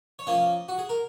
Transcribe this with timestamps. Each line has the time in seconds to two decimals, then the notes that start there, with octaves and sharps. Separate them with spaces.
0.19 C#5
0.27 F3 A#3 C#4 D#5
0.68 F#4
0.78 G#4
0.89 A#4